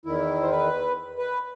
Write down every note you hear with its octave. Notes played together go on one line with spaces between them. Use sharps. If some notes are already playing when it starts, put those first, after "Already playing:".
E2 D#3 E4
C5
B4
B4